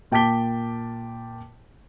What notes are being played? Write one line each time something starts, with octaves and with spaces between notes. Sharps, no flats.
A#2 G5 A5 D6 B6 G7